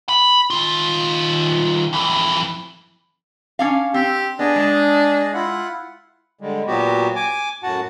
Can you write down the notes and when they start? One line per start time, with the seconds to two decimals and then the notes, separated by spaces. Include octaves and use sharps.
0.09 B5
0.50 D#3 F4
1.93 F2 E3
3.59 C#4 D4 F5
3.94 C4 G4
4.39 B3 D4 G#4 D#5
4.56 G#3 A5
5.34 E4 F4 F#5
6.41 D3 G3 G#3
6.67 A#2 F#3 B3 F#4 G4
7.16 G#5 D6
7.63 F#2 A2 F#4 F#5 A5